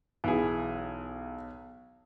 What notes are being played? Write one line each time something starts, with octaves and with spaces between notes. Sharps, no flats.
B1 E3 G#4